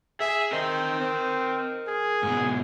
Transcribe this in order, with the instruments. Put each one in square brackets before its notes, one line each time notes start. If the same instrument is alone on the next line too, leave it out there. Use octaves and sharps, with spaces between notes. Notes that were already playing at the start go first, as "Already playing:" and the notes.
[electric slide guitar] G#4 G#5 [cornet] E5
[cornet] C4 [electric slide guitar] A#4 D#5
[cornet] C4
G#4
[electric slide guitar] G#2 B2